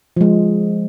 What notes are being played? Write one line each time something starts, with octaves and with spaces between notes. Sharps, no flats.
F3 G#3